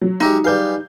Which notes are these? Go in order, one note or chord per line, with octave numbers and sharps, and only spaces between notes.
F#3
G#3 D#4 G4 E5
G3 G#4 B4 F5 G6